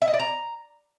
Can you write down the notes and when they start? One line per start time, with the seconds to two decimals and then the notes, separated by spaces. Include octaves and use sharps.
0.02 E5
0.08 D#5
0.14 D5
0.20 A#5